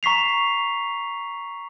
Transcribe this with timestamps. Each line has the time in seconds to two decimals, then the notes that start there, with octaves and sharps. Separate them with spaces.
0.03 A#5 C#6 B6 C7 F7